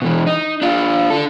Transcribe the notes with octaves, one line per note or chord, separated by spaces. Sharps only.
B2 E3
D#4
D4 F4
D4 A4